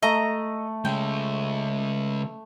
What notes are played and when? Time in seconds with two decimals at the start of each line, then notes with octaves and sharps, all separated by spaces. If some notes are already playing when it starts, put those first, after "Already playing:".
0.02 A3 D#5 A#5
0.85 C#3 G#3 G5